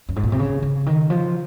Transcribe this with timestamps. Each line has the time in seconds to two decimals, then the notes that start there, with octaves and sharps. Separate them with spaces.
0.09 F#2
0.16 G#2
0.23 A#2
0.32 C3
0.39 C#3
0.63 C#3
0.86 D#3
1.10 F3